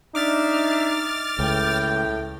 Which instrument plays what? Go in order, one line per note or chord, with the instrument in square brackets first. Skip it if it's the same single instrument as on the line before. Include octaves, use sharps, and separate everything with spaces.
[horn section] D4 E5 [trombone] D#4 [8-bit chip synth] D6 F6 A6
[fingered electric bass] C#2 [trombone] A2 [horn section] G5